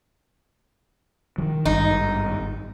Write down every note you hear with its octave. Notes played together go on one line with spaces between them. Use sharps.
D#3 F3
G#1 G2 D#4